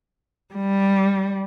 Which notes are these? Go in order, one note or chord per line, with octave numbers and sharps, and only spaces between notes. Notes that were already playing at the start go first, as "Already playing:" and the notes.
G3